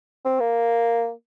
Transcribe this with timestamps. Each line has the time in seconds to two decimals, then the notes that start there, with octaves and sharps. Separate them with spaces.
0.25 C4
0.40 A#3